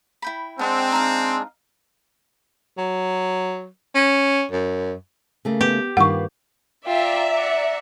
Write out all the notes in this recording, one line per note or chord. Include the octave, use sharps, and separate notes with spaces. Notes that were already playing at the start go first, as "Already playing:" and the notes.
E4 G5 B5
G#3 C4 D4 F#5
D#4 F5
F#3
C#4
F#2
C#3 A3 A#3
B3 G4
G2 D#3 A#3 F4 B4 F#5 C#6
F4 D5 E5 G5 A#5
F#5